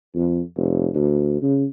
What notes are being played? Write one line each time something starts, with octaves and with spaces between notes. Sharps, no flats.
F2
F1
D2
C#3